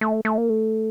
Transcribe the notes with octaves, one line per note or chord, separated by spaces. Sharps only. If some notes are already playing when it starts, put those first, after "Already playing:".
A3
A3
A#3
A3